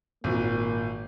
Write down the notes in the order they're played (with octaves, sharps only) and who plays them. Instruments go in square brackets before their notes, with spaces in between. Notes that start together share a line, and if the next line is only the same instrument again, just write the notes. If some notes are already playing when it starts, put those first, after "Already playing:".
[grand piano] G#1 A#2 [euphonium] A#3